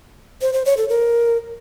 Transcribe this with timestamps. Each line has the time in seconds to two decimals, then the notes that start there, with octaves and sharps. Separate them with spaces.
0.42 C5
0.54 C5
0.65 C#5
0.77 A4
0.89 A#4